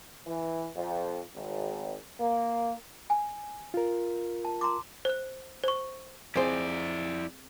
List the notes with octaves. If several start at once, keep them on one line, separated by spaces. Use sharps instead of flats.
E3
F2
G#1
A#3
G#5
F4 A#4
A5
A#5 C6 D6
C5 F#6
C5 C#6
F2 C4 E4 G#4 C5 D5 G#5